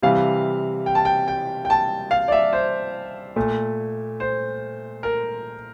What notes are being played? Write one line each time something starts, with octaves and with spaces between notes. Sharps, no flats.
C3 E3 G3 F5
G5
A5
G5
G5
G5
A5
F5
D5
E5
C5
A#2 A3
C5
A#4